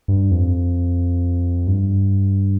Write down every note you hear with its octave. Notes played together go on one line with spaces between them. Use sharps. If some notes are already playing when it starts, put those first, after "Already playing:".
G2
F2
G2